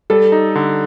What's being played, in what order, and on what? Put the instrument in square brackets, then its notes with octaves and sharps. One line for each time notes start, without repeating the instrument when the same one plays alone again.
[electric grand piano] G3 [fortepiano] A4
[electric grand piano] D#4
D3